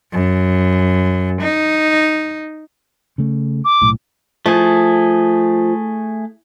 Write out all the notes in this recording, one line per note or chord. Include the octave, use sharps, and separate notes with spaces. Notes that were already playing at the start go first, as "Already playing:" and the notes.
F#2
D#4
C#3 A3
D6
B1 A2
F3 A3 G#4